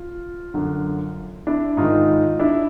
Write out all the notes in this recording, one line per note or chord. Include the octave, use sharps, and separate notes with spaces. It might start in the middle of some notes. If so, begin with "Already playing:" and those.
Already playing: F4
F#2 D3
D4 E4
G#2 D#3 D#4 F4
D4 E4